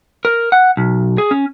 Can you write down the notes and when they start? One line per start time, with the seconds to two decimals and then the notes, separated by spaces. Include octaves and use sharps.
0.25 A#4
0.52 F#5
0.77 B1
1.18 G#4
1.31 C#4